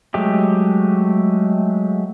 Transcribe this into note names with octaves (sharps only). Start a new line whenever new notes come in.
F#3 G#3 A3 G4